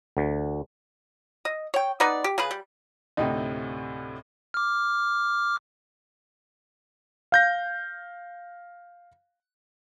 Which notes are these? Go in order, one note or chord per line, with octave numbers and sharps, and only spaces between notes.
D2
D#5
C#5 G5
B3 D#4 B4 D5
G4
C#3 G#4 B4
G3
D2 A2 C3 D#4 G5
D6 F6
F5 G6 A#6